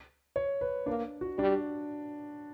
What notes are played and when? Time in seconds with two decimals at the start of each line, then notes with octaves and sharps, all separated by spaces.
0.36 C#5
0.61 B4
0.86 A#3 D4
1.21 F#4
1.38 G3 D4